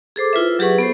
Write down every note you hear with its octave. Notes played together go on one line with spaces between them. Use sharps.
G#4 A4 C5 D6
E4 F4 B4 E5
F#3 G4 G#4 B4 F#5 C#6
B3 A4 C5